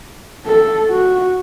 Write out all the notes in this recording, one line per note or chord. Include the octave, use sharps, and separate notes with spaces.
A4
F#4